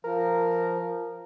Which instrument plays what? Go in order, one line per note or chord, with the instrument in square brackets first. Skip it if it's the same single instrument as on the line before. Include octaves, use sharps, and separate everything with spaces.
[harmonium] F3 [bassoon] A#4